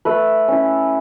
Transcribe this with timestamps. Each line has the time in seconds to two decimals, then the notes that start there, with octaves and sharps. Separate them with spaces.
0.05 A3 B4
0.48 C#4 E4